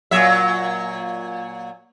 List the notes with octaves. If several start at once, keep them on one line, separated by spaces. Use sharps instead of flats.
A#2 F#3 E5